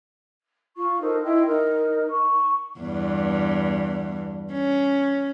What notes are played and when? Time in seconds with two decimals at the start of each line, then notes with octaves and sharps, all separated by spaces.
0.76 F4 C#6
0.99 D#4 A4 A#4 C5
1.23 E4 D#5 G5 C6
1.47 D#4 A#4 D#5
2.10 C#6
2.80 E2 G2
4.52 C#4